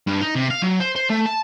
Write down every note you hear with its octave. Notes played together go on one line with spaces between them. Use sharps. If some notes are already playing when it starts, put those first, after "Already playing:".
G2
D#4
C3
F5
F#3
C5
C5
A3
A5